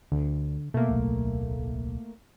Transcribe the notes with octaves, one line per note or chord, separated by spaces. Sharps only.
D2 D3
B2 A3 A#3
D1 B1